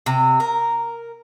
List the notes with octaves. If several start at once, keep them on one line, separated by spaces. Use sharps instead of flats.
C3
A#4